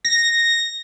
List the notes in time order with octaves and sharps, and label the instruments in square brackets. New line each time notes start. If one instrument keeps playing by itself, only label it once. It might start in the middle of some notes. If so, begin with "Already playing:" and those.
[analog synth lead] A#6